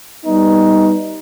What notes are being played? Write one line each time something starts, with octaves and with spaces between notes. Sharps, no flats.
G3 B3 D#4